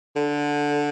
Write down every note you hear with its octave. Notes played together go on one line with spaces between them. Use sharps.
D3